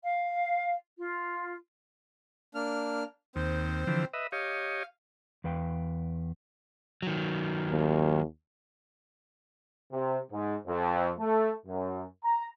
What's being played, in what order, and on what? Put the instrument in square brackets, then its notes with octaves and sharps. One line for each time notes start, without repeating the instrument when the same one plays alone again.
[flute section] F5
F4
[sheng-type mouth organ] A#3 D4 F6
[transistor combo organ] D#2 [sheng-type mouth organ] C4 C5
[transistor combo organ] D3 E3 F3
B4 D#5 E5
[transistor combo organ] G4 C#5 D#5 [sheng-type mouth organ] F5
[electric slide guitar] E2 B4 F5 G5
D#3 F#3
[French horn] D#2
[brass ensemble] C3
G#2
F2
A3
F#2
A#5